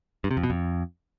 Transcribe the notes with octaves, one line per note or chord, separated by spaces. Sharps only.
G2
C3
F2
B2
F2